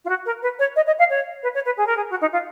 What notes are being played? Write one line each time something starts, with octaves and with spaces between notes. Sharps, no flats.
F4
F#4
A#4
B4
C#5
D#5
D#5
F5
C#5
B4
C#5
B4
G#4
A#4
G#4
F#4
D#4
F4